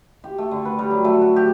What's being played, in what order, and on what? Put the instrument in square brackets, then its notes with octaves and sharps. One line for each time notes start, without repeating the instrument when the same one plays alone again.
[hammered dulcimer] G4
A3
D3
B4
G3
F#3
A3
F#4
G4